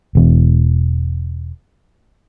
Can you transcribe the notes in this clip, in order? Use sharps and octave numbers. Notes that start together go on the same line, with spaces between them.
E1 E2